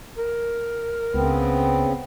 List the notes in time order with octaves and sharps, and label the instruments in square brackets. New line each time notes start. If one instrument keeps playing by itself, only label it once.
[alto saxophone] A#4
[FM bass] C#2 [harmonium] C#3 C4 [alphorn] B3